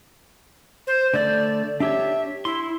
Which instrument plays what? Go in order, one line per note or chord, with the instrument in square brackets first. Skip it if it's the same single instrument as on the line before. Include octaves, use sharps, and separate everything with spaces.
[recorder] C5
[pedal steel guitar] D3 A3 G6 [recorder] D5
[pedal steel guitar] D4 G4 C#5 [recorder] E5
[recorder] E4 [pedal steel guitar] C6